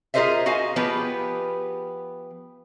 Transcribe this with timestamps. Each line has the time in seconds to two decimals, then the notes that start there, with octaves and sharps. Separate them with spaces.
0.14 F4 G#4 A#4 C5 D#5 E5
0.46 F#4 D#5 F5 G#5
0.76 F3 B3 G4 G#4 B4